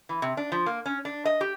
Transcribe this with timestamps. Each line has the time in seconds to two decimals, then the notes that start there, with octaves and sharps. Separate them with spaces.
0.09 E3
0.22 C3
0.37 D4
0.52 F3
0.66 A#3
0.86 C#4
1.05 D4
1.25 D#5
1.41 G4